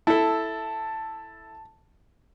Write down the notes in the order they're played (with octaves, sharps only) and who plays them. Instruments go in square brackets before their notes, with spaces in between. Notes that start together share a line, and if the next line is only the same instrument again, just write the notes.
[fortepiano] E4 A4 [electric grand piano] A5